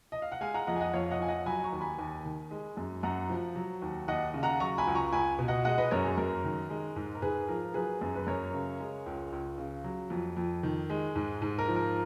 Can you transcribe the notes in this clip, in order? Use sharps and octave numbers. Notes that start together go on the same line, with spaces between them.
D#5
F5
F#5
G#3 F5 G#5
F#5 A#5
F2 D#5 F#5
G#5
D#5 F#5
F2 C#5 F5
D#5 F#5
F3 G#5
D#5 F#5
F#3 G#5 B5
A#5 C#6
D#2
G#5 B5
D#2
D#3
G#3
F#2
F#2 F#5 A#5
F3
F#3
D#2
D#2 D#5 F#5
C#3
F#5 A#5
F#3 A#5 C#6
G#5 B5
C#2
A#5 C#6
C#2 G#5 B5
B2
D#5 F#5
G#3 D#5 F#5
B4 D#5
F#2 A#4 C#5
G#4
F#2 A#4
D#3
G#3
G#2
A#4
G#2 G#4 B4
F3 A#4
F#3 G#4 B4
F#2
B4
F#2 A#4 C#5
C#3
G#3
C#2
C#2
C#3
F#3
F2
F2
D#3
G#3
G#2
G#2
A#4
F3
A#4